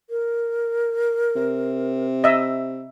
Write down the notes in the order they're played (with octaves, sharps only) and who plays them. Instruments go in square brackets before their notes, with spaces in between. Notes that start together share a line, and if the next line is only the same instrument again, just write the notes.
[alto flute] A#4
[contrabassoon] C3
[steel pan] D#5 E5